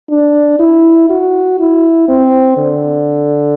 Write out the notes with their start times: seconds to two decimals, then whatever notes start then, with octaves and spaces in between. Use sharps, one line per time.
0.10 D4
0.59 E4
1.10 F#4
1.59 E4
2.08 C4
2.57 D3